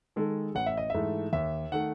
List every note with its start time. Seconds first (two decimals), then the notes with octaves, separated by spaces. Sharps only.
0.16 D#3 G#3 A4
0.55 A1 F#5
0.66 E5
0.77 D#5
0.90 G#2 E3 A3 E5
1.33 D#2 E5
1.72 D#3 A3 F#5